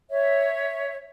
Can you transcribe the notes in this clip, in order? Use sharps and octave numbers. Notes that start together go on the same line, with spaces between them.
C#5 E5